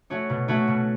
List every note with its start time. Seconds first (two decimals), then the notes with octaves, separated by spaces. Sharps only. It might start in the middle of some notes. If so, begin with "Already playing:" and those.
0.10 A3 C#4 F#4 C#5
0.29 B2
0.48 A3 C#4 F#4 C#5
0.68 B2